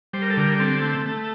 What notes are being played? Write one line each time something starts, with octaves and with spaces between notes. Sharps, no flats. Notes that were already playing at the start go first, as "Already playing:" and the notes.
G3 C5
A#4
A4
D3 A#4
C4 A4
A3
A3